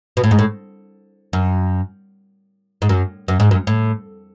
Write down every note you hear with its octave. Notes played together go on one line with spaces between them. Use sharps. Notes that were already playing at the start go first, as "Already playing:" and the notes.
B2
A2
G#2
A2
F#2
G#2
F#2
F#2
G#2
F#2
A2